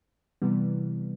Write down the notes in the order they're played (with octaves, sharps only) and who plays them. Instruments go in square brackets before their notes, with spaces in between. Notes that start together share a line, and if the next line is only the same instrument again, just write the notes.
[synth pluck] C3 E3 G3 B3